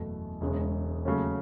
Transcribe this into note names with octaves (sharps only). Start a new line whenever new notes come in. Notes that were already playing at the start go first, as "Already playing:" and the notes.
Already playing: F#1 E2 B2 A3
E1 E2 C#3 G#3 C#4
D#2 C#3 F#3 A3 C#4